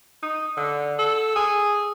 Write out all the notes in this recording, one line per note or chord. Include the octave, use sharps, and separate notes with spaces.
D#4
D3
A4
G#4